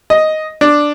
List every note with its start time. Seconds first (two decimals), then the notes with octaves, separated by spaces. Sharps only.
0.10 D#5
0.61 D4